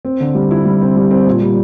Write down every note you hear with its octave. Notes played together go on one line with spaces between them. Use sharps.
C4
D3
G3
E4
G3
C4
G3
C4
A#2
G3